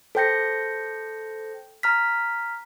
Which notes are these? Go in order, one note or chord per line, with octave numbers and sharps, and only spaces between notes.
A4 C5 G5 G6 A#6 C#7
A#5 F6 B6